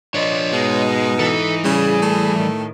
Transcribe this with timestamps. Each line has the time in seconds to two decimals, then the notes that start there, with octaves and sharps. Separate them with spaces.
0.14 F3 D4 C#5 D#5
0.53 G#2 B2 G#3 D#4
1.19 E3 A4
1.64 A2 C#3 G3 G#4
2.02 A3
2.35 A2 D#3